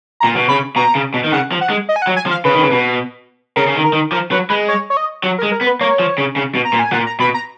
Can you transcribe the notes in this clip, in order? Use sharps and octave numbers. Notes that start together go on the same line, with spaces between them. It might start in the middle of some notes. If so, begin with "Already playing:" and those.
A#5
A#2
B2
C#3 B5
B2 A#5
C#3
B2
D#3
C#3 F#5
F3
F#5
G#3
D#5
G#5
F#5
F#3
G#5
F3
F5
C#3 B4
D#3
C#3
B2
C#3 A#4
C#3
D#3
A#4
D#3
F3 A#4
F#3 B4
G#3 B4
C#5
C#5
D#5
F#3
A#4
G#3
A#4
B3
B4
A#3 C#5
F3
C#3
C#3
B2
A#5
A#2
G#5
A#2 F#5
A#5
B2 B5
A#5